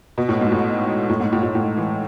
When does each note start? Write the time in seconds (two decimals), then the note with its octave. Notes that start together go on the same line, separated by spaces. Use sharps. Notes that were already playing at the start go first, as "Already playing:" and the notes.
0.18 B2
0.29 A2
0.41 G#2
0.52 A2
1.10 A2
1.20 G#2
1.33 A2
1.43 A2
1.55 A2
1.77 E3